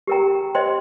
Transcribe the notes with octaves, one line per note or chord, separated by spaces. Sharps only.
G4 A#4 G5 A#5
C5 D#5 G5 C6